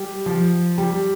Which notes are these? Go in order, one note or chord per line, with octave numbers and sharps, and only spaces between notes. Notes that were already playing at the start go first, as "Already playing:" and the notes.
Already playing: G3
F3
G3